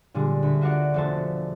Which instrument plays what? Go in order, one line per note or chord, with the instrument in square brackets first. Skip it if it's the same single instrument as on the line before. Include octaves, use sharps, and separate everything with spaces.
[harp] A#2 D3 G3 G#3
D2 B5
F4 F#4 A#4 D5 F#5
E1 F3 A3 C5 A5